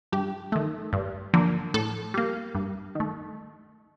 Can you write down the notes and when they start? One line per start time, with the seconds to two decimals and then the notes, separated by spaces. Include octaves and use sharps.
0.12 G2 G4
0.52 D#3 A3
0.93 G2
1.34 D3 F3 A#3
1.74 A2 A4
2.14 G3 A#3
2.55 G2
2.95 D#3 A3